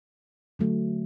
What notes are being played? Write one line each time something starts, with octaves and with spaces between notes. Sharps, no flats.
D3 F#3 A3